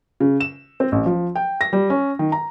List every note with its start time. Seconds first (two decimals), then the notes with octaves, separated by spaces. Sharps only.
0.20 C#3
0.40 E7
0.80 C4
0.92 A1
1.06 F3
1.36 G5
1.61 A#6
1.73 G3
1.90 C#4
2.19 D#3
2.32 A#5